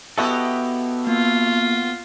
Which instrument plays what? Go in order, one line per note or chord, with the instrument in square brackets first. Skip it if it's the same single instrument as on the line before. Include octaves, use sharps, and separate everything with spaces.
[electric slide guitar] B3 F#4 A4 [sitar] E4 G4 D#5
[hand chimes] A#3 [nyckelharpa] F4